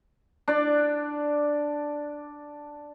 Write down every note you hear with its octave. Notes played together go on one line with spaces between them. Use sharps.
D4 D5